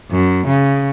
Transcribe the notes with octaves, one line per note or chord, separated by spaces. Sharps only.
F#2
C#3